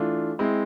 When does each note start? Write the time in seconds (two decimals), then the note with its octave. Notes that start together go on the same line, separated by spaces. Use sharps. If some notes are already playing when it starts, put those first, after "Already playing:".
Already playing: E3 A3 D4 F4
0.39 G#3 C4 E4